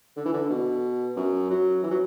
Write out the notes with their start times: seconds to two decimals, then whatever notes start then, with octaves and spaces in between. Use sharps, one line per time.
0.17 D3
0.26 E3
0.33 D3
0.50 B2
1.17 F#2
1.50 F#3
1.83 E3
1.91 F#3